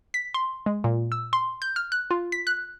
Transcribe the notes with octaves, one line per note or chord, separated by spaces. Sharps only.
B6
C6
G#3
A#2
E6
C6
G6
F6
F#6
F4
B6
F#6